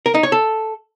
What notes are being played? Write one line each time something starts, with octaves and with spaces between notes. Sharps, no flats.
A#4
D#4
C#5
A4